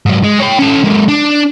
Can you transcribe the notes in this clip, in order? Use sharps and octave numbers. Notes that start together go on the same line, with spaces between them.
G#2 F#3
G#3
C#5 G5
C#4 A4
G#3 A#3
D4